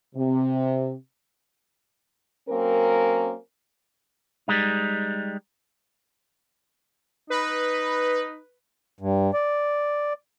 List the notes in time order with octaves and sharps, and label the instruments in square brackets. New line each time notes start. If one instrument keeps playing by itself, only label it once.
[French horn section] C3
F#3 A#3 C4 C#4 A#4
[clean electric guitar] G3 G#3 D#4
[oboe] D#4 [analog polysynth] B4
[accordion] G2
D5